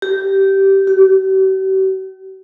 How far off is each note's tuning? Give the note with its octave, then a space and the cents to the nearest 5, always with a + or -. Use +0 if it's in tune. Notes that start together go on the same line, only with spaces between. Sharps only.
G4 -15
G4 -45